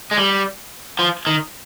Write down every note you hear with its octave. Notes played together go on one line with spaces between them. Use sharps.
G#3
G3
F3
D#3